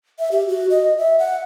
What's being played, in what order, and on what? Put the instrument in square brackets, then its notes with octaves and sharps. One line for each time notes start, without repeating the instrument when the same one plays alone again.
[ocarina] E5
G4
F#4
D#5
E5
F#5